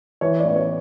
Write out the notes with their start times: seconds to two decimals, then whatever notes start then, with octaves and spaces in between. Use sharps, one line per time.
0.21 E3 C#5
0.39 A1 D5
0.56 C#5